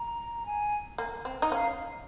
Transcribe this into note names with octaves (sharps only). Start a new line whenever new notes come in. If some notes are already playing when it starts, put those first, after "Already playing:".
Already playing: A#5
G#5
A#3
C4
D#4
C#4 F5